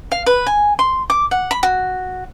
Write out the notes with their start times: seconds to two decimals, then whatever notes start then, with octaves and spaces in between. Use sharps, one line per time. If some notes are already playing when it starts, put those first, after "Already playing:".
0.12 F5
0.26 B4
0.47 G#5
0.79 C6
1.10 D6
1.31 F#5
1.51 B5
1.63 F#4